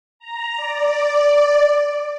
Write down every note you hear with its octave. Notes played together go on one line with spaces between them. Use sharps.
A#5
D5